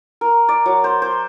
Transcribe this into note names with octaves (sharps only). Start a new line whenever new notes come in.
A#4
D5
F#3
C5
C5